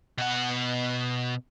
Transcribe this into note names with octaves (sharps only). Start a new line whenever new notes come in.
B2 F#5